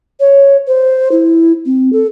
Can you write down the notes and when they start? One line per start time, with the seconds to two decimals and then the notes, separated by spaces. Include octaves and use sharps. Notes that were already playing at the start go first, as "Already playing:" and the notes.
0.20 C#5
0.67 C5
1.12 E4
1.66 C4
1.93 A4